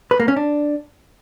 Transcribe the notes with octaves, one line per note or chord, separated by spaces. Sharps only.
B4
A#3
C#4
D4